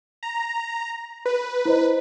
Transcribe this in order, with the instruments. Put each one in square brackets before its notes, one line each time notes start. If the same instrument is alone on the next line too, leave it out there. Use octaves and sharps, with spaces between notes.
[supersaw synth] A#5
B4
[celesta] E4 C5 D#5